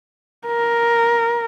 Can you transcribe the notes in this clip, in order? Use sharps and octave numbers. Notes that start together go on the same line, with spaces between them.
A#4